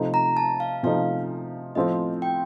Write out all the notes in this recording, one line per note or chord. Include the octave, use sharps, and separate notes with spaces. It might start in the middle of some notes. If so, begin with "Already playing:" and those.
Already playing: C3 F3 A3 D#4
A#5
A5
F5
C3 F3 A3 D#4 F5
A2 F3 C4 D#5
G5